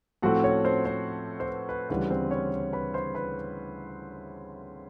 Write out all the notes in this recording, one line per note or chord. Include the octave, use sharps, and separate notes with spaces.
A2 F3 A3 C4 F#4 F#5
C#4 C#5
C4 C5
C4 C5
C5
B4
B4
D2 C#3 E3 G3 B4
C4 C5
C#4 C#5
B4 B5
C5 C6
B4 B5